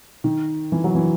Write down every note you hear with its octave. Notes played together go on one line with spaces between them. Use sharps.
D#3
E3
F#3
E3